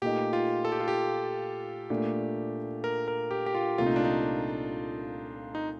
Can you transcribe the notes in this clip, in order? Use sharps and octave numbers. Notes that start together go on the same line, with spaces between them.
A#2 A3 D#4 G4
F4
A4
G4
F4
G4
A#2 A3 D4
A#4
A#4
G4
G4
F4
C2 A#2 A3 C4 F4
D#4
D4
D#4
D#4